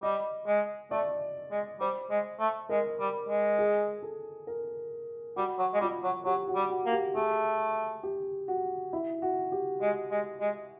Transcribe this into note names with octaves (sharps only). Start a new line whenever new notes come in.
G3 D#5
G#3
A3 D5
G#3
G3 C5
G#3
A3
G#3 A#4
G3
G#3
G#4
A4
A#4
G3 F#4
F#3
G#3
G3 F4
F#3
F#3 G4
F#4
G3
F#4
A#3
G4
A3 G#4
G4
F#4
E4
F#4
G4
G#3
G#3
G#3